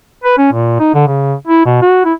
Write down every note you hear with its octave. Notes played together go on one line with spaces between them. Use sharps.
B4
C#4
A#2
D#4
D3
C#3
E4
B2
F#4
E4